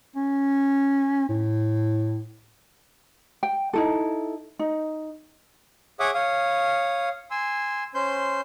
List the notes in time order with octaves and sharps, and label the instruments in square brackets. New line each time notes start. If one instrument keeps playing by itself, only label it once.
[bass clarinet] C#4
A2
[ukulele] G5
D#4 E4 A4
D#4
[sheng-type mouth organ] G#4 C#5 E5 F#5 D6 D#6
C#5 F5 D#6
G#5 C6 E6
C#4 C5 C6 G6